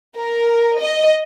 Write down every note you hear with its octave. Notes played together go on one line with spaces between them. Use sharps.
A#4
D#5